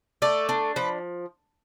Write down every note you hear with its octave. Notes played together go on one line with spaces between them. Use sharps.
A3 D5
D4
F3 B4